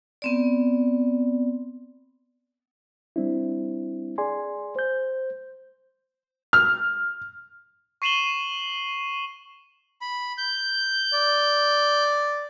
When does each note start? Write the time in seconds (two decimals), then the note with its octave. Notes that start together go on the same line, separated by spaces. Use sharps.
0.22 B3 C4 D5
3.16 G3 C4 D4 E4
4.18 G#4 D5 G#5 C6
4.76 C5 G6
6.53 F6
8.02 C#6 C7 D#7 E7 F#7 G7
10.01 B5
10.38 G6
11.14 D5